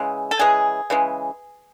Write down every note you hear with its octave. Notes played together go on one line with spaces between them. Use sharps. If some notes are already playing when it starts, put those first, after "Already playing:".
Already playing: C#3 E3 G#3
A4
C#3 E3 G#3 G#4
C#3 E3 G#3